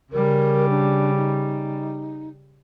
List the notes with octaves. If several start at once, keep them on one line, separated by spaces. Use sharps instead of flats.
C#3 G3 A#4
D4
D#4